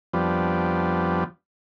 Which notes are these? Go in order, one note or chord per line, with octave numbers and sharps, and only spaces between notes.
F2 F3 G3 B3 D4